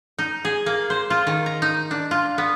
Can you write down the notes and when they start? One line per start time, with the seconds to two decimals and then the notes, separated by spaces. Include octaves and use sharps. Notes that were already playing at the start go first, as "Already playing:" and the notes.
0.19 D#4
0.45 G#4
0.66 A#3
0.90 C5
1.10 F4
1.27 D#3
1.46 A#5
1.62 D#4
1.91 D4
2.11 F4
2.38 B3